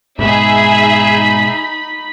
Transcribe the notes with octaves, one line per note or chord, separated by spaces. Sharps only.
G#2 B2 G#3 D#4 G#4 E5 B5